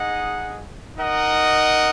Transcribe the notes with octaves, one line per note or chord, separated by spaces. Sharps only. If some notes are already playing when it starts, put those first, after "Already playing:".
Already playing: D#4 G#4 D#5 F#5
D#4 A#4 D#5 F#5